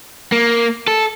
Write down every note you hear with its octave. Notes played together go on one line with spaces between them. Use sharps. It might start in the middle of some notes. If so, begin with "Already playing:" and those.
A#3
A4